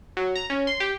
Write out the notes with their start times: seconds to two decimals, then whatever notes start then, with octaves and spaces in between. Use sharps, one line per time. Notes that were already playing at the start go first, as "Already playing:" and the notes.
0.17 F#3
0.36 A#5
0.50 C#4
0.67 C6
0.80 G4